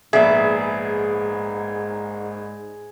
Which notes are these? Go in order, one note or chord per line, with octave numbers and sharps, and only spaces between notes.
A#1 G#2 B3 G#4 D5 E5